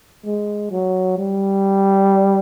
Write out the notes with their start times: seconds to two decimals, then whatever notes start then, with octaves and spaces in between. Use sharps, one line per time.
0.25 G#3
0.71 F#3
1.18 G3